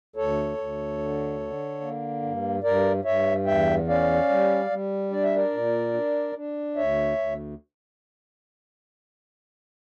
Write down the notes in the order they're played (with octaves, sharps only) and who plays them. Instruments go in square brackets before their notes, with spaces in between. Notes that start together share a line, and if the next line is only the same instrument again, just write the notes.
[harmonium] D2 A4 C#5
D2
D3
D3
A#3
G2
G2 A#4 D5
G2 C#5 E5
E2 E5 G5
C#4 D5 F5
G3
G3
D4 D5
E5
A#4 D5
A#2
D4
D4
D2 C#5 E5
D2